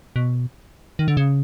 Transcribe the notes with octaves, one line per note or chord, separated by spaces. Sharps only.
B2
D#3
D3
C#3